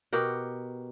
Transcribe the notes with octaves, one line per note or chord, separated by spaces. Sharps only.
B2 G4 A#4 F#5